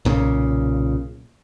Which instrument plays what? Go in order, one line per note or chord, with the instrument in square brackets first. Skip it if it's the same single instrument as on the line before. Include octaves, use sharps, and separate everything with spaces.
[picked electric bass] B1 A#2 C#3